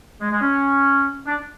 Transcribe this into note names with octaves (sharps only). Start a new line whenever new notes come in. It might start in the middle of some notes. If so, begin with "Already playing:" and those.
G#3
G#3
C#4
D4